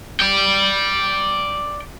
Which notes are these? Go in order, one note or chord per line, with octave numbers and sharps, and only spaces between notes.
D5 G5